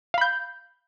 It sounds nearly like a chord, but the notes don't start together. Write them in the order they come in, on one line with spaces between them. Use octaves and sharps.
F5 B5 G6